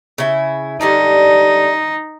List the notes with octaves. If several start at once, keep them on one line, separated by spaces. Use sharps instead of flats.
C#3 E4
D3 G3 D4 D#4